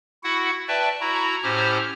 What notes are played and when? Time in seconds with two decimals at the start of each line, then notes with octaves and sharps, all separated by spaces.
0.24 E4 F#4 F#5
0.68 B4 D5 E5 G5 A5
1.01 E4 F#4 A#5
1.43 A2 C#4 G4 C5 A#5 F6